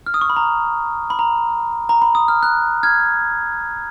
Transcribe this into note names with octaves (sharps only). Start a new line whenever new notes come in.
F6
D#6
C#6
B5
A#5
B5
A#5
A#5
B5
D#6
F6
F#6
F6 G#6